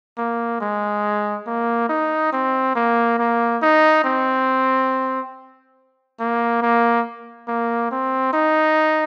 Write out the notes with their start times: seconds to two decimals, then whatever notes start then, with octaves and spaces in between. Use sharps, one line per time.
0.18 A#3
0.60 G#3
1.47 A#3
1.89 D#4
2.32 C4
2.75 A#3
3.18 A#3
3.62 D#4
4.04 C4
6.20 A#3
6.62 A#3
7.48 A#3
7.91 C4
8.33 D#4